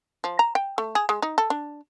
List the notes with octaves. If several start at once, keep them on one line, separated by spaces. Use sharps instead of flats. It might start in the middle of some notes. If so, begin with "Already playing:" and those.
F3
A#5
G5
A3
G#4
G#3
D#4
A4
D4